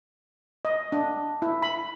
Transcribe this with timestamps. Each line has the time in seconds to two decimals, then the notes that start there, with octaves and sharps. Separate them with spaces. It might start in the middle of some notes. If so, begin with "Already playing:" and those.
0.65 D#5
0.92 D4
1.42 E4
1.62 B5